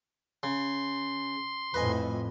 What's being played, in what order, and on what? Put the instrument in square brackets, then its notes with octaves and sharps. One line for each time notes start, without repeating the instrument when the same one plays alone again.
[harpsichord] C#3 [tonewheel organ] C6
[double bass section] F2 A2 [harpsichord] B4 D#5 G#5